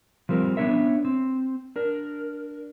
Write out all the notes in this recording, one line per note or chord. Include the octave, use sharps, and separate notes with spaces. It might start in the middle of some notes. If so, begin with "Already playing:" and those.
F3 G3 C4 A#4
B3 C#4 D4 A#4 C#5 E5
C4
D4 A#4